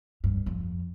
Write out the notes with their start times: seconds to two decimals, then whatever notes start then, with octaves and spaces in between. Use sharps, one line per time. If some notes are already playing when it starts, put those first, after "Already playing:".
0.24 G2
0.46 F2